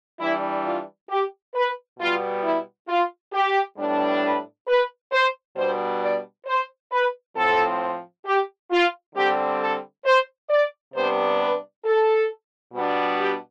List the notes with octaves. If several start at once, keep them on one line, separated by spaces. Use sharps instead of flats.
E3 G3 D4 E4
F4
G4
B4
B2 G3 B3 F4
E4
F4
G4
A2 G3 B3 D4
B4
B4
C5
B2 G3 B3 D4 C5
D5
C5
B4
A2 F3 C4 A4
G4
F4
D3 G3 C4 G4
A4
C5
D5
C3 G3 B3 D4 C5
B4
A4
B2 G3 B3 D4
G4